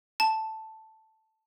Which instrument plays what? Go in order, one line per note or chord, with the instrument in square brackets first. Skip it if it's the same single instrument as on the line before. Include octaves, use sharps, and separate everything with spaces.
[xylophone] A5